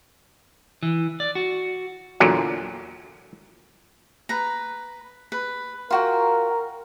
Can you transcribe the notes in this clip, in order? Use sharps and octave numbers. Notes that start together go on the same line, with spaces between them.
E3
D5
F#4
E2 A#2 D3 F#3
B4 A#5
B4
F4 F#4 A#4 G5